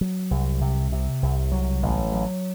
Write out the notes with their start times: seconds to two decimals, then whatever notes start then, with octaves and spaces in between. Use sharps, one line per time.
0.01 F#3
0.31 C2
0.61 C3
0.92 C3
1.23 C2
1.52 F#3
1.83 A1
2.12 F#3